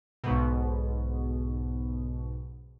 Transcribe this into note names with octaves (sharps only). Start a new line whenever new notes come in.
B1 G#2 B2